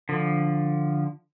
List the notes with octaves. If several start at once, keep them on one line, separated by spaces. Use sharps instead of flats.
D3 F3